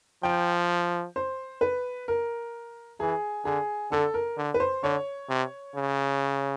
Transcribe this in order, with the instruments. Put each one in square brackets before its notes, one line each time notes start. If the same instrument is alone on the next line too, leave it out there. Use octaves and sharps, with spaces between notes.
[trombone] F3 [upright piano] G5
[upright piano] C5
B4
A#4
[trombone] E3 [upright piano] G#4
[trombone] D3 [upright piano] G#4
[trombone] D3 [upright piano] A4
[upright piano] A#4
[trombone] D3
[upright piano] B4
C5
[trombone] D3 [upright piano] C#5
[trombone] C3
C#3